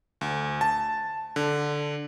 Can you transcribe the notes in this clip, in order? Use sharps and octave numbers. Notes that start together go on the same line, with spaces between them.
D2
A5
D3